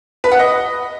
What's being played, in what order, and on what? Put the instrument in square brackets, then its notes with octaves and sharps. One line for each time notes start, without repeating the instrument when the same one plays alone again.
[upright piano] B4
F#5
D#5